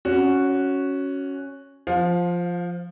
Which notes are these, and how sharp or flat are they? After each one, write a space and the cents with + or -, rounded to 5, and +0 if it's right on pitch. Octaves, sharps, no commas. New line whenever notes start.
C#4 +0 F#4 +0 D5 -40
F3 +0 F5 +30